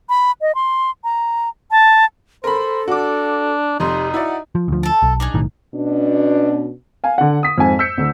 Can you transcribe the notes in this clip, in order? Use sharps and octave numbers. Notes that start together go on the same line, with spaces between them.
B5
D#5
C6
A#5
A5
A4 A#4 C5 B5
D4 F#4 D6
F1 F2 D#4 G4 C6
E4 F#4 D5 F#5
F3
D2 F3
A4 A5
B1
D4 D#4 G#4
B1 A2 D#3
B2 C#4 D4
F5 G#5
D3 F#5
D#6 B6
F2 G#2 G#5
E6 G6 B6 C#7
D2 D3